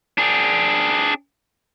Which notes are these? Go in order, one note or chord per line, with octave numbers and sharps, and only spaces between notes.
D4 G#4